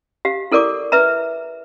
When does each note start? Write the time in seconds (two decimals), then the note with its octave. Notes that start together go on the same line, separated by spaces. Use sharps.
0.25 G4 F5
0.52 E4 A4 A#4 D5 C#6 D6
0.92 B4 E5 A#5